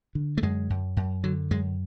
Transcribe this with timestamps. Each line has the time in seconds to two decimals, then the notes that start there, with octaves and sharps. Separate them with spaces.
0.15 D3
0.38 A3
0.42 F#2 G#3
0.70 F#2
0.97 F#2
1.24 D3 F#3
1.51 F#2 G#3